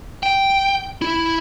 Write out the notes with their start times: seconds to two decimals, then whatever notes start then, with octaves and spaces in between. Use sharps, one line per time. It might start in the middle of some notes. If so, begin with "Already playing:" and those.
0.23 G5
1.02 E4